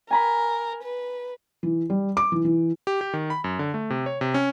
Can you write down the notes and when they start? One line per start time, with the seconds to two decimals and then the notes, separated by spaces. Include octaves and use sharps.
0.10 A#4 G#5 A#5 B5
0.83 B4
1.63 E3
1.90 G3
2.17 D6
2.32 E3
2.45 E3
2.87 G4
3.01 G4
3.13 D#3
3.30 B5
3.44 F#2
3.59 D3
3.74 A3
3.90 C3
4.06 C#5
4.21 C3
4.34 C#4